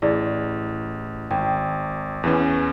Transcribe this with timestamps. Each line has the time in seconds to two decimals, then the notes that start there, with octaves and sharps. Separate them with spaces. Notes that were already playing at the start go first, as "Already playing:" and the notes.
0.02 A1 E4 G#4 D5
1.31 G#1 G5
2.24 E2 E3 C#4